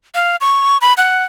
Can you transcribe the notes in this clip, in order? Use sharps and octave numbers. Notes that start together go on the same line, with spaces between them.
F5
C#6
B5
F#5